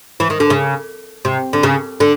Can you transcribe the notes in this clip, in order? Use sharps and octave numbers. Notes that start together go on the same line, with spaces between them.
E3
D#3
D3
C#3
C3
D3
C#3
D3